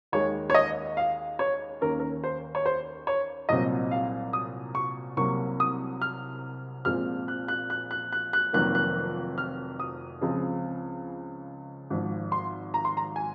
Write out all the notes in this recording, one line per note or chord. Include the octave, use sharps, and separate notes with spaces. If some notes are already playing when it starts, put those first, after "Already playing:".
D#2 D#3 G#3 C#5
C#5
D#5
F5
C#5
D#2 D#3 A#3 C#4 A#4
A#4
C5
C#5
C5
C#5
C2 A#2 F#3 C4 D#5
F5
D#6
C#6
C2 C3 F#3 A#3 C#6
D#6
F6
A#1 A#2 G#3 C4 F6
F#6
F#6
F#6
F#6
F#6
F#6
F1 F2 D#3 F#3 A#3 F#6
F#6
F6
D#6
C#2 C#3 F3 G#3 C4
G#1 G#2 F3
C6
A#5
C6
A#5
G#5